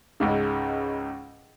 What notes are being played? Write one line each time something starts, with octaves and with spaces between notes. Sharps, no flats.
C#2 G#2 C#3